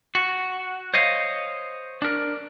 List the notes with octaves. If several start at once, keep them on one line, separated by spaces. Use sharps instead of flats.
F#4
C5 C#5 D#5 F5
D4 A#4